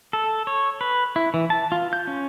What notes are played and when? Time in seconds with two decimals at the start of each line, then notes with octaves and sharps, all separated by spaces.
0.13 A4
0.47 C#5
0.81 B4
1.16 E4
1.34 E3
1.50 A5
1.72 F4
1.93 G6
2.07 C#4